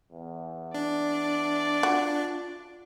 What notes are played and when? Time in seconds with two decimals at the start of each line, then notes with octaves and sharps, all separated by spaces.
0.12 E2
0.74 D4 D5
1.83 F4 F#4